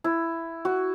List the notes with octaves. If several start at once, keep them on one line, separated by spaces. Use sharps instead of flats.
E4
F#4